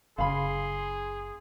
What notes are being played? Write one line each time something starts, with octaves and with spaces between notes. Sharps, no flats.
F#1 C#3 G#4 F5 B5 C6